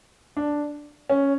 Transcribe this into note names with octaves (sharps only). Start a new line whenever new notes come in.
D4
C#4